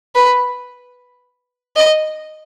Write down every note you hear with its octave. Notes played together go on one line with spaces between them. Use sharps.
B4
D#5